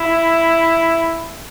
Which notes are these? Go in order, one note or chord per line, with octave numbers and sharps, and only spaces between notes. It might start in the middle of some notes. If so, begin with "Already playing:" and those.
Already playing: E4